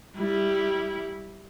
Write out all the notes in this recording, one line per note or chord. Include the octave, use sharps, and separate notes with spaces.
G3 E4